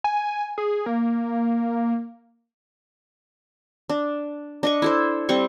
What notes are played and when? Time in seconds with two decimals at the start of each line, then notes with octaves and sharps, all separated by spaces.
0.04 G#5
0.58 G#4
0.86 A#3
3.89 D4
4.63 D4 D#5 C#6
4.82 E4 A4 C5
5.29 G3 C4 C6 C#6